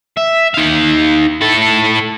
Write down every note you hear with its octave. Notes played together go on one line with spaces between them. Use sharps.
E5
D#4 F5
E4 A4